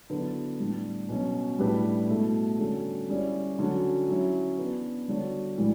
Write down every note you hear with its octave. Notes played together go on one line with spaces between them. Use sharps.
D3 F#3 B3 E4 B4
A2 G3 D4
B2 F#3 C#4
A2 G3 D4 G4 B4
B2 A3 E4
D3 G3 C#4 F#4 A4
G3 C#4 E4 G4 D5
D3 F#3 C#4 F#4
F#3 C#4 E4
E3 B3 D4
D3 G3 D4 F#4 C#5
A2 E3 G3